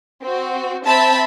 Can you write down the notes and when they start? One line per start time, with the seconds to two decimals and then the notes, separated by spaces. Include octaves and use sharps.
0.24 C4 F#4
0.85 C4 E5 A5 B5